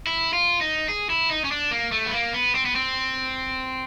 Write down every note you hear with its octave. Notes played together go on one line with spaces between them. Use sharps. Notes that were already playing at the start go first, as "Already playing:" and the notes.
E4
F4
D#4
G#4
E4
D#4
C#4
D4
A#3
A3
B3
A#3
B3
C4
B3
C4